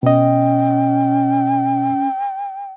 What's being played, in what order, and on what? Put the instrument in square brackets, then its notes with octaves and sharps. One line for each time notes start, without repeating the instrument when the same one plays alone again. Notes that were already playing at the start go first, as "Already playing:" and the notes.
[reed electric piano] B2 D#5 [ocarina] C#4 [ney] G5